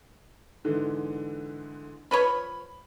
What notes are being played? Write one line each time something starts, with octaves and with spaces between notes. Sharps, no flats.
G#2 D3 E3
F3 B4 C#5 B5